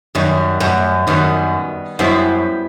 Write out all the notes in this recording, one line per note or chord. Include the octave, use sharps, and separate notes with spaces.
F#2 D#3 G3 B3
F#2
F#2 D#3 G3 B3
F#2 G3 B3 E4 G4 C5